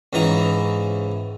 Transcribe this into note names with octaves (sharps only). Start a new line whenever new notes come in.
C#2 G#2 E3 A#5 C#6